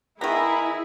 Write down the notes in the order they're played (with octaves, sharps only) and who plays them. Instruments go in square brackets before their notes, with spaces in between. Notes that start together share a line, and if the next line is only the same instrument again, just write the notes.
[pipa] D#3 B3 [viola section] E4 [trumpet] G#4 [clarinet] A#5